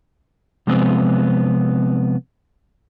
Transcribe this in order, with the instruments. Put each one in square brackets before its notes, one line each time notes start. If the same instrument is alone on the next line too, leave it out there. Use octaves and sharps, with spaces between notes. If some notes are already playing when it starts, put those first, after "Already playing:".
[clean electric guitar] C3 F3 G#3 B3 C4